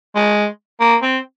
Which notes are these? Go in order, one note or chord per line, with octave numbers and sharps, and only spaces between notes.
G#3
A#3
C4